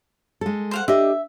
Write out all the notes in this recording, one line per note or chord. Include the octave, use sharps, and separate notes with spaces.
G#3 A4
C5 F5 F#5
D4 G4 D#5 E5